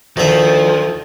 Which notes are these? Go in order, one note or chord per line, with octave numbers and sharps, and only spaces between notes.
D2 D#3 F3 E5